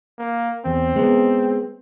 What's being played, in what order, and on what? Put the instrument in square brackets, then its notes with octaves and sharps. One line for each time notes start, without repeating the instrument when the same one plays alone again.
[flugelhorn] A#3
[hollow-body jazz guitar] E2 [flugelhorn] C4
[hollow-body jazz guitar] G#3 B3